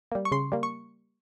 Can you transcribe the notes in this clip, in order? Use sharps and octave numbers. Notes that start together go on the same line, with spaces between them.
G3 A#3
C#6
C#3 C6
G3 A#3
C#6